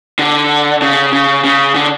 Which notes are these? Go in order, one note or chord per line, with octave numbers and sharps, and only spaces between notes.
D3
C#3
C#3
C#3
D3